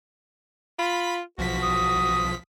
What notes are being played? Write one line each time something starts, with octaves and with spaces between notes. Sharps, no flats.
F4 B5 B6
B1 F3 F#4 B6
D#6